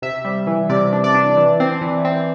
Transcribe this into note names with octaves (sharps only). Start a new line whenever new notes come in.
C3 E5
G3
E3
C3 D5
D4
D5
D4
E3
C4
E3
C4